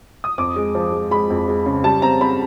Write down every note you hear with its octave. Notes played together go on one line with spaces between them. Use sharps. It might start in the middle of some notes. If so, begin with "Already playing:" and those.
D#6
F2 D6
G#3
F3
G#3
G#3 B5
F2
G#3
C#3
G3 A5
C4 A#5
C4 B5